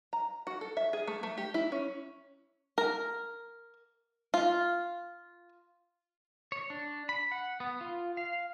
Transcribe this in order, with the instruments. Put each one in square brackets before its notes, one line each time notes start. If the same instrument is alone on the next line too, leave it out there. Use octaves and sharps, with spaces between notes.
[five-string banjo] A#5
F#4
A4
E5
G#4
A3
A3
G4
E4
C#4
A#4
F4
[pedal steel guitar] C#5
D4
B5
F#5
B3
F4
F5